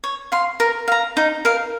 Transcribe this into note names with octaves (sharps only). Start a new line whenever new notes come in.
C#5
F5 C6
A#4
F5 A#5
D#4
A#4 F5